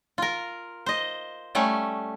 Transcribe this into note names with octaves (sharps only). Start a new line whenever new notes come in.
F4 A#4
C5 D#5
G3 A3 C#4